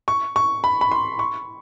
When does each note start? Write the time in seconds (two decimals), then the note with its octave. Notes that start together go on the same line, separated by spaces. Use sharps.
0.08 C#6
0.36 C#6
0.64 B5
0.81 B5
0.92 C6
1.19 C#6